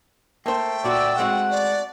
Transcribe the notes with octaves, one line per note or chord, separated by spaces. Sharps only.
A3 A#3 C5 G5
A#2 F#4 D5 E6
G#3 C4 F#4 F#5
D5